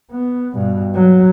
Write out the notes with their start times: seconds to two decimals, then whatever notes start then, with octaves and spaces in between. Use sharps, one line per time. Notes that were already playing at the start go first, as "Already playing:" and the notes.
0.12 B3
0.55 G2 B2
0.95 F#3